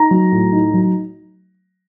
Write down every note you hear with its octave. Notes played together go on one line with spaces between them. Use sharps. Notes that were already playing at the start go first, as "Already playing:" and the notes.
Already playing: D#4 A#5
F#3
A2
D#4
F#3